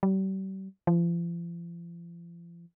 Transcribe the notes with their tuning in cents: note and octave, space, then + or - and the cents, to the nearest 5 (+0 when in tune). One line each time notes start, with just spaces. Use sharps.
G3 -40
F3 -40